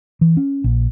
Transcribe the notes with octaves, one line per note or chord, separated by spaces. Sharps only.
E3
C#4
A#1